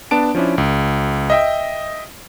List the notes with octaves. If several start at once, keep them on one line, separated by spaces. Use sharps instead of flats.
B3 D4 A5 D7
F3 C#4 D4 E4
C#2
D#5 E5 G5